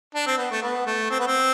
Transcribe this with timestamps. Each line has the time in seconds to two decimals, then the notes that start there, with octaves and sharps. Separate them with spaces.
0.15 D4
0.26 C4
0.38 B3
0.51 A3
0.62 B3
0.87 A3
1.10 C4
1.20 B3
1.27 C4